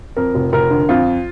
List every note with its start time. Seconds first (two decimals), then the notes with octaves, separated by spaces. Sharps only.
0.17 F2 A#4
0.35 F1
0.52 F1 A#4
0.70 D3
0.89 F2 F4